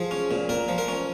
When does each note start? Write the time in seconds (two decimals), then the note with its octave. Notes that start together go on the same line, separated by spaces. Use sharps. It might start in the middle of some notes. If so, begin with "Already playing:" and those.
Already playing: F3 G#4
0.11 C#4
0.31 A#2
0.49 A#2 A#4
0.68 F3
0.78 A#4
0.88 C#4